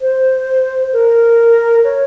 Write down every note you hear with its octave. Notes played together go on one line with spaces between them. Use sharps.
C5
A#4
C#5